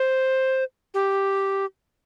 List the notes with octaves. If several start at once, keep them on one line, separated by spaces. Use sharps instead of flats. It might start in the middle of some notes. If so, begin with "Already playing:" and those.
Already playing: C5
G4